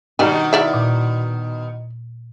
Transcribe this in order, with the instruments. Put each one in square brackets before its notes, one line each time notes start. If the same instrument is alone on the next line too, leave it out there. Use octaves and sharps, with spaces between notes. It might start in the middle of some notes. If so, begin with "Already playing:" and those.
[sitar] B2 D#3 [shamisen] G3 D4 G#5 [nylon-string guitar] D#4
[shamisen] E4 D5 E5
[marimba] A#2